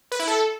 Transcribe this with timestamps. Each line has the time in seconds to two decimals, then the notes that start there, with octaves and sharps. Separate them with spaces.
0.12 B4
0.19 E4
0.27 A4